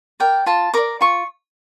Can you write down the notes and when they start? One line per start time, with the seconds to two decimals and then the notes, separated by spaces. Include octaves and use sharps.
0.20 A#4 D5 G5
0.46 F4 A5
0.74 A#4 D5 D6
1.01 F4 C#6